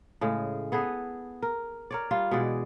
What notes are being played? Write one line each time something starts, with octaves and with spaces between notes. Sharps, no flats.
A2 C#3 G#3
B3 G#4 A4 B4
A#4
A#4 C#5 D5
G3 F4 F5
B2 E3 G#3 D5